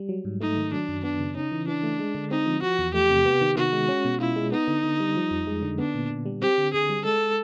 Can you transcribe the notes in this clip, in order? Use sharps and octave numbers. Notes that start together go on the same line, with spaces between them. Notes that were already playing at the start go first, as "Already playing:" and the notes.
Already playing: G3
F#3
G#2
A3 D#4
D#3
F#3 D4
F#2
B3 D4
C#3
C#4 D#4
E3
E3 D4
A3
G#3
D3
C4 D#4
F3
F3 F#4
E2
A3 G4
C3
B3
D#3
D#3 F#4
G#3
C#4
B2
E4 F4
G#3
B3 D#4
D3
D3
G3
F3
F2
G#3
D3
B3 D4
A#2
A#2
G3
C4 G4
D3
D3 G#4
G3
G#3 A4